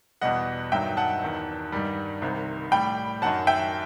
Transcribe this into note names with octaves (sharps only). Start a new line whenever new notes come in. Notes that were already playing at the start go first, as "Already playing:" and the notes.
E2 B2 G3 D#5 F#5
G2 D#3 F#3 E5 G5
F#5 A5
E2 D#3 F#3
G2 D#3 G3
C2 C3 D#3
A2 G3 G5 B5
F#2 D#3 F#3 F#5 A5
E5 G5